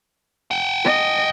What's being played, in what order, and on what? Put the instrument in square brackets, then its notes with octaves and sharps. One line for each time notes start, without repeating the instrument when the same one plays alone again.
[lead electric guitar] F#5 G5
[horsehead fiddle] D#5